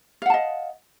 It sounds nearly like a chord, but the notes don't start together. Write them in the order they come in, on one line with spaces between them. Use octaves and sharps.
F5 F#5 A5 D#5